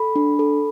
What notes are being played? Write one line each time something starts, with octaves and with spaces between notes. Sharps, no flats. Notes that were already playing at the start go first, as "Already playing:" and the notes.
Already playing: A4 B5
D4
A4